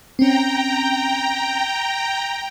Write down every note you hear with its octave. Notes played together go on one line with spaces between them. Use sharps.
C4 C#4 G5 A#5